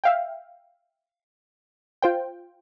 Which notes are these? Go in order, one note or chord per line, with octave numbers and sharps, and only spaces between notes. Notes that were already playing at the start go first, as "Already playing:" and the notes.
E5 F5 G5
F4 C5 G5